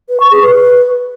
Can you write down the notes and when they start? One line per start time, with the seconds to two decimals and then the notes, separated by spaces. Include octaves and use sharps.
0.09 B4
0.20 C#6
0.31 G#4
0.42 B4